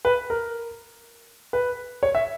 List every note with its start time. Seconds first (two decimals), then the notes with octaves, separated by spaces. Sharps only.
0.05 B4
0.30 A#4
1.53 B4
2.03 C#5
2.15 E5